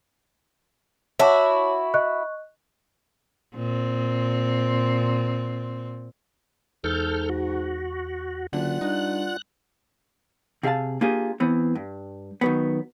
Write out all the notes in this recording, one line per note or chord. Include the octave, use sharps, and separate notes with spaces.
E4 F#4 C#5 A5 D6
D#5 C#6 F#6
A#2 C4
E2 G#2 A4 F6 G6
F#4
F#1 D3 F4 D5 F#5 F#6
G2 D#4
C3 G#4 E5 F5 A5
A#3 D4 F4 G4 G#4
E3 B3 C4
G2
D#3 F#3 B3